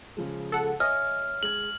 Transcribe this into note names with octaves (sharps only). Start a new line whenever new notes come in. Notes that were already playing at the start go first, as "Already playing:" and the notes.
C#3 F3 G#3
A4 F#5
C#5 D#5 E5 G#5 F6
G#3 G#6 F#7